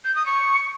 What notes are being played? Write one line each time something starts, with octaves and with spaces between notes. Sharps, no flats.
G6
D#6
C#6